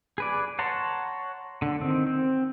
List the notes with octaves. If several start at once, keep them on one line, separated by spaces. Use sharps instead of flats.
G#4 B4 D5
C#5 F#5 A5 A#5 C6
D3
D#3 C4
C4